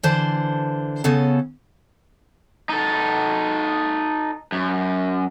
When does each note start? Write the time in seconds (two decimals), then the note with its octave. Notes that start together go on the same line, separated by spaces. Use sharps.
0.03 D3 E3 C5 A5
1.04 C#3 B3 C#4 A4
2.69 D#4 A4
4.52 F#2